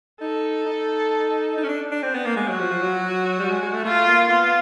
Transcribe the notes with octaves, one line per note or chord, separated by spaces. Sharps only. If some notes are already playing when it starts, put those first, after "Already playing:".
D#4 A4
D#4
D#4
C#4
D4
D4
C4
B3
A#3
G#3
F#3 F#4
F3
F3
F#3
G3
G#3
G#3
A3
A3 F4
A#3
B3 F4